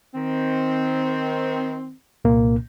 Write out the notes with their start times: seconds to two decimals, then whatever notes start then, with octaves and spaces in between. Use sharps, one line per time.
0.15 D#3 C4
2.25 C2 A#2 A#3